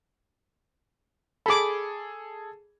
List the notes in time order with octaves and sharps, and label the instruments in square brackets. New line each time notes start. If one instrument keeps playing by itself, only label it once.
[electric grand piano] G#4 A4 [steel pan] B5 D6